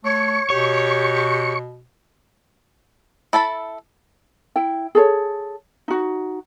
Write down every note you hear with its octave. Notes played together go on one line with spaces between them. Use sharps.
A3 C#5 C#6
B2 G4 C#5
E4 A4 A5 B5
E4 G5
G#4 A4 C#5
D#4 F#4